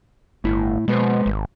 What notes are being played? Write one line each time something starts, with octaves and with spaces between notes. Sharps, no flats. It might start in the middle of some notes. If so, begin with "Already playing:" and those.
G1 A2 E4
B2 G#3 B4 C5
G#1